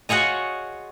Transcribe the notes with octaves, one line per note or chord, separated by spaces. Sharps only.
F4 F#4 G#4 C#5 D#5